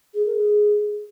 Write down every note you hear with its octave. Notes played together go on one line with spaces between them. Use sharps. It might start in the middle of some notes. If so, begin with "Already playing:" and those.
G#4
A#4
G#4